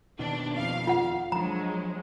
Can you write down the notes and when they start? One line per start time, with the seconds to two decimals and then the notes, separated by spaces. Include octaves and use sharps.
0.19 D#2 B2 D#3 D4
0.54 F2 F5
0.87 F4 F#5
1.32 F3 F#3 G#3 D4 A#5